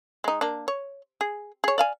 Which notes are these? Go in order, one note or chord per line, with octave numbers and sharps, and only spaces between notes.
G#3 D#4
A#3 D4
C#5
G#4
G#4 C#5
D5 F5 G#5